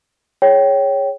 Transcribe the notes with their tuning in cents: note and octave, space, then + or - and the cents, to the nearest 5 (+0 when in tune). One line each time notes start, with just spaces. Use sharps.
G#4 +0 C#5 +0 G5 -10